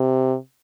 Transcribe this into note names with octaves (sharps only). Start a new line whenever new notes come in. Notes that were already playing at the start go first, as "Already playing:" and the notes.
Already playing: C3